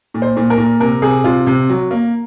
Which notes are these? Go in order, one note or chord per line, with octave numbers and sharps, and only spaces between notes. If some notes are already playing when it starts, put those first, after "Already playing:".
A#2
C5
A#2
A#4
A#2
C3 A#4
C3 G#4
C3 F4
C3
F#3
A#3